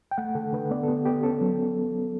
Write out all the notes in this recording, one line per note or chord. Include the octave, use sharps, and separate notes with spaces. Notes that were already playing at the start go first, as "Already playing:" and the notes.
G5
A3 F#5
D3 A4
D3 B4
B3 D5
A4
B3 G4
B3 G4
C#4 A4
F#3